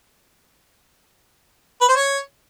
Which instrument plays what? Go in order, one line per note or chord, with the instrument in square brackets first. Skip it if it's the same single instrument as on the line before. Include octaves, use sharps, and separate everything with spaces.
[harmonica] B4
C5
C#5